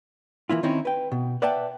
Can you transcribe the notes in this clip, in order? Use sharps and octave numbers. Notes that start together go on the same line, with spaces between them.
E3 A#3 E4 F4
D#3 C4 C#4 D#4 E4
B4 G5
B2
B4 D5 E5 F#5 G5 A5